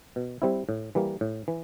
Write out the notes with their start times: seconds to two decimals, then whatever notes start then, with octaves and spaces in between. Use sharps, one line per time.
0.16 B2
0.42 G3 C4 E4
0.69 A2
0.95 E3 G3 A#3
1.21 A2
1.48 E3